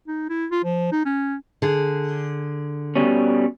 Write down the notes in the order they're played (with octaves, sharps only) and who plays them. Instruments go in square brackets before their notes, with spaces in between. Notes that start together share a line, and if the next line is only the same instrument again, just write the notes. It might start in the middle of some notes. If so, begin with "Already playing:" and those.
[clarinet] D#4
E4
F4
F3
D#4
C#4
[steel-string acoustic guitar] D3 G#4
[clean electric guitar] B2 G3 C#4